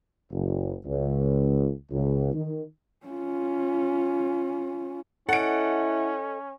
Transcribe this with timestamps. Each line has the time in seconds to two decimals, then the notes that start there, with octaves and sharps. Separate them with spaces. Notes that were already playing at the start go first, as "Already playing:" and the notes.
0.32 F#1
0.85 C#2
1.91 C#2
2.34 D#3
3.06 C#4 F4
5.29 C#4 E4 A4 D#5 F#5 D7